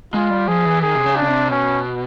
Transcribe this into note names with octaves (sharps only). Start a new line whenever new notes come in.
G#3 F4
G3
F3 G#4
E3
D#3 G#4
C3
C#3
D4
C#3
C3
B2 C#4